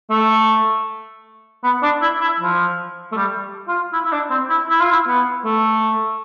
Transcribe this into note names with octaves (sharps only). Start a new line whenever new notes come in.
A3
B3
D4
E4
E4
F3
A3
G3
F4
E4
E4
D4
C4
E4
E4
F4
E4
B3
A3